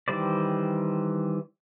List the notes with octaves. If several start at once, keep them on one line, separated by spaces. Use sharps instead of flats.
D#3 E3 G3 C5 D5